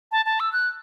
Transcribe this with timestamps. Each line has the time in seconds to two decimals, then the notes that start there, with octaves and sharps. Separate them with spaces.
0.12 A5
0.26 A5
0.40 E6
0.53 F#6